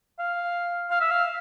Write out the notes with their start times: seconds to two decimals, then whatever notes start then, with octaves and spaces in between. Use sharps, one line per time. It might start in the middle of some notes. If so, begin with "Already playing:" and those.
0.19 F5
0.90 F5
1.01 E5
1.11 F5